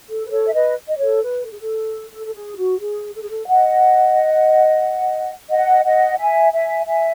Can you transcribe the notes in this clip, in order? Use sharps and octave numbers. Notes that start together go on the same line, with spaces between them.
A4
B4
A4 C#5
E5
B4 D#5
D#5
A4 C#5
B4
A4
G#4
A4
A4
A4
G#4
F#4
G#4
A4
G#4
A4
D#5 F#5
D#5 F#5
D#5 F#5
E5 G#5
E5 G#5
E5 G#5